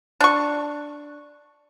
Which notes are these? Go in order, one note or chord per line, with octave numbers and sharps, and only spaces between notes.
D4 C#6